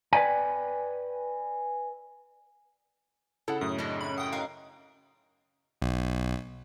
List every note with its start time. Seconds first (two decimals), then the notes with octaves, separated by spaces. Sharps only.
0.13 B4 C5 D5 G5 G#5
3.48 C#3 E4 A4 F#5
3.61 F#2 A2 D#6
3.78 C#3 A3 C#4 D4 E4 D#5
4.01 B5
4.18 F#5 G5 D#6
4.32 D#4 F#4 A#4 F5
5.82 B1